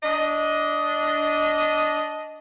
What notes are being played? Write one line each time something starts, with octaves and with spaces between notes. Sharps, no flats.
D4 D#5